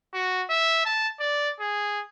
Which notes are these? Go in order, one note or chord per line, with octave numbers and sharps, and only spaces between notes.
F#4
E5
A5
D5
G#4